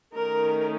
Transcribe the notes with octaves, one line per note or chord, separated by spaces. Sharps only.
D#3 A3 C#4 A#4